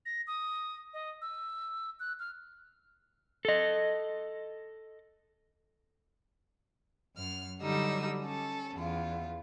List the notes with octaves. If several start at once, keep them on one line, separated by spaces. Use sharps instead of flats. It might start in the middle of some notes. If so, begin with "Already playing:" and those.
A#6
D#6
D#5
E6
F#6
F6
A4 D#5
F#2 F6
D3 F#3 G3 D#4 E6
C#4 A4
E2 F4